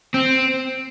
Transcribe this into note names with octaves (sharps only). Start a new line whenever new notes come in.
C4